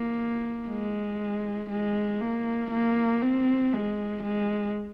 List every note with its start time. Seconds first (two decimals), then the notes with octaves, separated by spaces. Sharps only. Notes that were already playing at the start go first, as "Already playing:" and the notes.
Already playing: A#3
0.68 G#3
1.70 G#3
2.21 A#3
2.71 A#3
3.22 C4
3.73 G#3
4.23 G#3